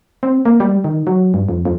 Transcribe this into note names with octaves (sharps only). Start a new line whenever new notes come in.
C4
A#3
G3
D#3
F#3
G2
F2
F2